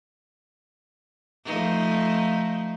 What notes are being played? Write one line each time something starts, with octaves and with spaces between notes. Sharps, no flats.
F3 A3 D#4